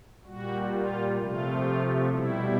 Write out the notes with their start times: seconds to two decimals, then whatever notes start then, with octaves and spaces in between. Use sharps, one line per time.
0.25 A#2 G3 F#4
0.72 F4
1.17 C3 F3 A3 F4
2.10 B2 G3 E4